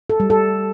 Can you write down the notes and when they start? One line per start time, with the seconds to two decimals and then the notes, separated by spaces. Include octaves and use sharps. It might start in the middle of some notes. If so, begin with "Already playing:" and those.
0.10 A4
0.20 G3
0.30 A4